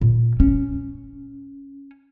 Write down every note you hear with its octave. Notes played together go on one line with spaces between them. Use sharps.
A#2
C#4